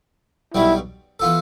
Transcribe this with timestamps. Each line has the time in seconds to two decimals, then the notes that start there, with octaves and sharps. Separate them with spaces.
0.54 B1 B2 G3 B3 E4
1.20 E3 B3 F4 A4